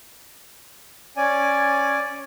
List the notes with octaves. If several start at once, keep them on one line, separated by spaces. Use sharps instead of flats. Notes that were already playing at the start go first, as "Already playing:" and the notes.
C#4 D5 G#5